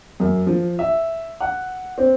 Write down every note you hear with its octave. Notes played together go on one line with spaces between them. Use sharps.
F#2
F3
E5
F#5
C4